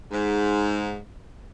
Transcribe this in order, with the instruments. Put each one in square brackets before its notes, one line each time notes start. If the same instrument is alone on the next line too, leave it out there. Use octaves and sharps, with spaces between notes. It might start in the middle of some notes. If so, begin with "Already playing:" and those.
[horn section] G#2